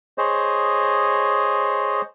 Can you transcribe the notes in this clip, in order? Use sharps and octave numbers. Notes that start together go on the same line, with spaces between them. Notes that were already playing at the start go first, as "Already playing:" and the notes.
G#4 C5 C#5 D#5